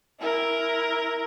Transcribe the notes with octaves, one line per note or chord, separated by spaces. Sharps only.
E4 A#4